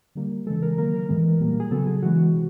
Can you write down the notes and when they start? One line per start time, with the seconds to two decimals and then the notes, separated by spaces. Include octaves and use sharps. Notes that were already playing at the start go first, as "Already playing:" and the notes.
0.15 D3 G3 A#3
0.47 C#3 E3 G#3 A4
0.62 A#4
0.78 D#3 F#3 A#3 A#4
0.93 A#4
1.09 A2 E3 G#3 B3
1.40 A#2 G3 A#3
1.60 G#4
1.71 C#3 F#3 B3 A4
1.87 G#4
2.02 C#3 E3 G#3 B3 F#4
2.33 C3